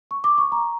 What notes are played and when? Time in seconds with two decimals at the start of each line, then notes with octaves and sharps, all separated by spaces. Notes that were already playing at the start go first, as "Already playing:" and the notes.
0.11 C#6
0.24 D6
0.38 C#6
0.52 A#5